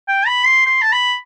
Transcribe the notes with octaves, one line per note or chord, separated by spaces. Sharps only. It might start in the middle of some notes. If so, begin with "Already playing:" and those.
G5
B5
C6
C6
A5
B5